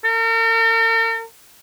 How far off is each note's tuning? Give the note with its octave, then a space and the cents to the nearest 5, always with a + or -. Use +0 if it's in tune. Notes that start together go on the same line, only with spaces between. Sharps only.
A#4 -45